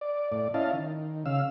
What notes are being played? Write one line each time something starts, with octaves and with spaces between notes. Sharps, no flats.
D5
A2 D5
C#4 E4 D#5 F5 A5
D#3
C#3 F5 E6